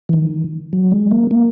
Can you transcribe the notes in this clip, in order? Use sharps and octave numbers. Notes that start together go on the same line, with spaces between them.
E3
D#3
F#3
G#3
A#3
A#3